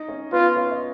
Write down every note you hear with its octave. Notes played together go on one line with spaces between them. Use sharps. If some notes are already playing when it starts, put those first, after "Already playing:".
Already playing: D#4 D#5
C#4 C#5
B3 F4 B4
C#4 C#5
D#5